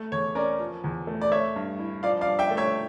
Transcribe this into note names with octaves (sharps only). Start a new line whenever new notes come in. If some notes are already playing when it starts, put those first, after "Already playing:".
Already playing: A3
E2 C#5
C#4 A#4 D5
F3
E2
A3
D5
A3 C#5 E5
G2
E4
F3 D5 F5
D5 F5
G2
E5 G5
A3
C#5 E5